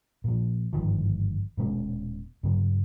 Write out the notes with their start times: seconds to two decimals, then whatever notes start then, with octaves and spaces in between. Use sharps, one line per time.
0.24 A#2 F3
0.73 G1 G#2 D#3 F3
1.57 D#1 B2 G#3 C#4
2.43 G2 C#3 F#3